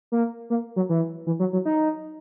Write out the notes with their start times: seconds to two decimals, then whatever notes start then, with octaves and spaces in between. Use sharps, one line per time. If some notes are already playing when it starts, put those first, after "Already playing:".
0.12 A#3
0.50 A#3
0.76 F#3
0.89 E3
1.27 E3
1.39 F#3
1.53 F#3
1.65 D#4